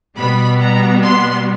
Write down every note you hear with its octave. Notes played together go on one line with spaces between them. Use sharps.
B2 G3 B3 B5
A#5
C6